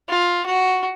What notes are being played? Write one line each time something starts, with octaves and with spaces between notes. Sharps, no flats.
F4
F#4